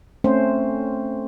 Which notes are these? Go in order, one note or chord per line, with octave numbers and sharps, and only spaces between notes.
A3 C4 C#4 C5